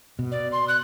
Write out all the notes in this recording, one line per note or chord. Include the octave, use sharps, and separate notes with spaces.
B2
D5
C6
F#6